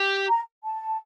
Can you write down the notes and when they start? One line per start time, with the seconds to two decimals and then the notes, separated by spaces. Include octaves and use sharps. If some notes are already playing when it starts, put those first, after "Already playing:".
Already playing: G4
0.29 A#5
0.64 A5